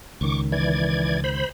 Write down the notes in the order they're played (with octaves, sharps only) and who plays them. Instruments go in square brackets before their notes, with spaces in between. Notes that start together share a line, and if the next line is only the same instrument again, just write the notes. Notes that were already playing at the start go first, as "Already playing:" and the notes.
[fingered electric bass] C#2 D#3 [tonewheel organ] C#6 D6
[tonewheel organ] E3 D5 G#6
C5 B5